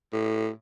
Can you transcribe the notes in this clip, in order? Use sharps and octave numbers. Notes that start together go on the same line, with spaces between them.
A2